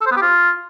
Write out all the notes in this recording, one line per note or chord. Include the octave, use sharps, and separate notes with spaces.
A4
C5
B3
G4
F4